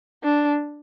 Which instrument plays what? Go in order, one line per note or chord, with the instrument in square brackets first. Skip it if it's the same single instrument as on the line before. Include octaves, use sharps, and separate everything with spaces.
[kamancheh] D4